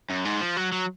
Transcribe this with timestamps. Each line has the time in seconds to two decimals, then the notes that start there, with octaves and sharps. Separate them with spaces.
0.10 F#2
0.25 G#2
0.41 F3
0.57 F#3
0.72 F#3